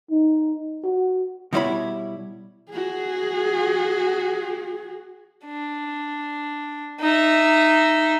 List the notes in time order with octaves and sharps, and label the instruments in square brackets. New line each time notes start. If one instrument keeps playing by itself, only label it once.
[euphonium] D#4
F#4
[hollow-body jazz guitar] B2 G3 D#4 E4 C#5 B5
[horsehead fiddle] F#4 G#4
[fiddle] D4
D#4 E5